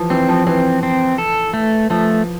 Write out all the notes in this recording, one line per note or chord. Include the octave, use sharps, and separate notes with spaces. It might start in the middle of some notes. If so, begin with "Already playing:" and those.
Already playing: E3 F3
E3 C4
F3
E3 C4
C4
A4
A3
F3 A3